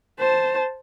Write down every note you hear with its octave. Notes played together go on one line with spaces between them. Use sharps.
C5 A5